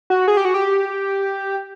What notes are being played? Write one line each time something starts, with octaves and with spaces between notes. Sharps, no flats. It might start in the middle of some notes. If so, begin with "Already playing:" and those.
F#4
G#4
G4
F#4
G4